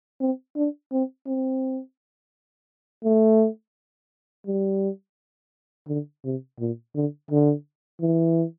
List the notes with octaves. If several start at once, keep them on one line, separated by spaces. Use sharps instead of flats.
C4
D4
C4
C4
A3
G3
D3
C3
A#2
D3
D3
E3